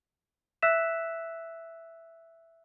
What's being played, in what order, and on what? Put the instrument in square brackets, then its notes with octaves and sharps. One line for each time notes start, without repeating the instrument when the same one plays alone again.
[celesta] E5 E6 F#6 B6 E7